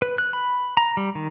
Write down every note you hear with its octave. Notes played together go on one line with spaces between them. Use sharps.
B4
F#6
B5
A#5
G3
D#3